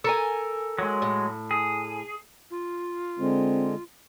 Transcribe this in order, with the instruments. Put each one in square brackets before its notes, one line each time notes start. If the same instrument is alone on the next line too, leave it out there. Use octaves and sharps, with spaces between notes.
[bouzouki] A4 A#4 G#5
[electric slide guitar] F#3 G#3
[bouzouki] A2
[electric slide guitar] G#4
[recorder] F4
[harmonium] D3 G#3 [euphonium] C4